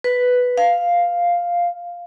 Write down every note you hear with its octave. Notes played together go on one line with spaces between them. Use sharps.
B4
F5